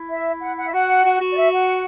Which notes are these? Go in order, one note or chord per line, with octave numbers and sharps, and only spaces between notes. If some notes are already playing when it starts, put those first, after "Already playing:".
Already playing: E4
E5
F#5
F#5
E5
F#4 F#5
F#4
F#4
D5
E5
F#5